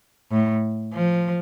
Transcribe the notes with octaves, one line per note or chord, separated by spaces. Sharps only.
A2
F3